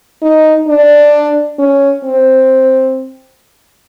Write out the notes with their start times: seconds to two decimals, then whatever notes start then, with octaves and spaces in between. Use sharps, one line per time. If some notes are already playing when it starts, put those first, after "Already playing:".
0.22 D#4
0.68 D4
1.59 C#4
2.04 C4